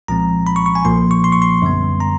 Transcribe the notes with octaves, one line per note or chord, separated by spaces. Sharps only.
C2 A#2 F3 G#3 C4 A#5
B5
C#6
C#6
G#5
B1 A#2 F3 A#3 C6
C#6
C6
C#6
C6
F#2 D3 G3 B3
A#5